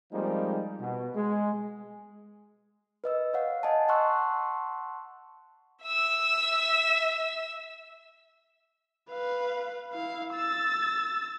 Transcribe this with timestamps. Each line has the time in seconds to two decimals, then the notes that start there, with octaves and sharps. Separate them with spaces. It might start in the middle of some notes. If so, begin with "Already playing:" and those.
0.13 F3 G3 G#3 A#3 C4 D#4
0.80 B2
1.16 G#3
3.04 B4 D#5 E6
3.34 C#5 F5 F#5
3.63 D#5 F#5 G#5 A5
3.88 F#5 A5 C6 C#6 E6 F#6
5.84 E5 E6
9.10 B4 F5
9.93 E4 F5
10.34 E6 A6